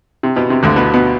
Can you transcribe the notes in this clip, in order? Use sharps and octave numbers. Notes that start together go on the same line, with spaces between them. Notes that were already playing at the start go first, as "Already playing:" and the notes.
C3
B2
C3
D2 D3
B2 B3
B2 B3